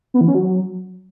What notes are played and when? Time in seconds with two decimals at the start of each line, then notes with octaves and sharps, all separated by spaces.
0.14 B3
0.21 E3
0.28 C#4
0.35 F#3